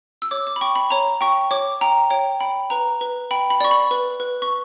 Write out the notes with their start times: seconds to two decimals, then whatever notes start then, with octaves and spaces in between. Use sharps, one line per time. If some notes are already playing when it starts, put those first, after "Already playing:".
0.22 E6
0.31 C#5 D6
0.47 D6
0.56 B5
0.61 G5 C#6
0.75 B5
0.90 C#5 A#5
1.21 G5 C#6
1.51 C#5 D6
1.81 G5 A#5
2.10 C#5 G5
2.40 G5 B5
2.70 B4 A#5
3.01 B4
3.31 G5 B5
3.50 B5
3.61 D5 C#6
3.71 B5
3.91 B4
4.20 B4
4.42 C#6